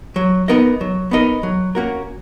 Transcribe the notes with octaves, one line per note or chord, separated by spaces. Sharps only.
F#3
B3 D#4 A#4 D#5
F#3
B3 D#4 A#4 D#5
F#3
A#3 C#4 F#4 A#4